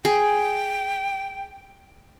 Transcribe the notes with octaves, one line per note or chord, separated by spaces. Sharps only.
G#4 G5